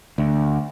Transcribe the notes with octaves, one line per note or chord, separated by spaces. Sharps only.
D2